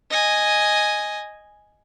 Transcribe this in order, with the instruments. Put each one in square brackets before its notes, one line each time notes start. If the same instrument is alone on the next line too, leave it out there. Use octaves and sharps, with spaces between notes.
[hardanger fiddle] D#5 G#5